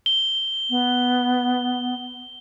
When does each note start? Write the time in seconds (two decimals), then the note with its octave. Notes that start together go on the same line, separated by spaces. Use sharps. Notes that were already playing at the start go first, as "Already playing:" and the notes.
0.06 G7
0.70 B3